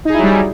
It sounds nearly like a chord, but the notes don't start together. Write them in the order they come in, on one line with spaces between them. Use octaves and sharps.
D#4 G#4 E4 F#3 G3